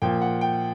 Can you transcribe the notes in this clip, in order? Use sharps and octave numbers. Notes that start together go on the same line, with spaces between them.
A#2 F3 A#3 G5
F#5
G5